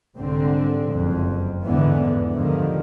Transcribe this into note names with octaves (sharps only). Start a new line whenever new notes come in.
C2 G#2 D3 C4
F#1 F2
E2 G#2 D3 E3 B3
G2 D3 D#3 F3